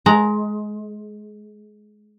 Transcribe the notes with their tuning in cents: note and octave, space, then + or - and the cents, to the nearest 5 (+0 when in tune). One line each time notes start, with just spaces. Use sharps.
G#3 +20 A#5 +0